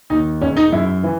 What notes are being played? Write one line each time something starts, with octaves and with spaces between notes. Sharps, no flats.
D#2 D#4
E1 C#4
D#4
F#2 E4
E3